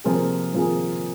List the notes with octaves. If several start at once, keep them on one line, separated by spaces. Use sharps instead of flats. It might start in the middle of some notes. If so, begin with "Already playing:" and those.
C3 F3 A#3 F4 G#4
C3 F3 A#3 F4 G#4